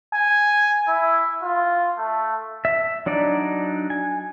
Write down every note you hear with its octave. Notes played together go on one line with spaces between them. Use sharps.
G#5
E4
F4
A3
E5
F#3 D4 D#4 D5
G#5